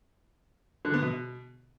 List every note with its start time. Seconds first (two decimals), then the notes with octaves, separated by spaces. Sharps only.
0.85 D3
0.94 B3
1.02 B2